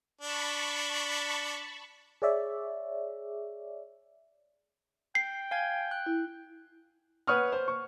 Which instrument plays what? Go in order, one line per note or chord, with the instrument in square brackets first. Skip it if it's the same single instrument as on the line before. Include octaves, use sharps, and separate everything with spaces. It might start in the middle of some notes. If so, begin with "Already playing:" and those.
[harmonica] D4 [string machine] A5 B5 C#6
[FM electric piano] G#4 C#5 D5 E5
[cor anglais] G5 [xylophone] C7
[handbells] F5 G#5 G#6
F#6
[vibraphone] E4
[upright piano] B4 C#5 F#5 C#6 D#6 F6
C5
C#6